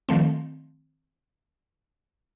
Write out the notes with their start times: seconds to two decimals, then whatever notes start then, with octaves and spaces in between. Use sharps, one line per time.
0.09 D#3 F3 A3 C4